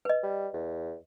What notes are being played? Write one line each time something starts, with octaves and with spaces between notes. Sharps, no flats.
B4 D#5
G3
E2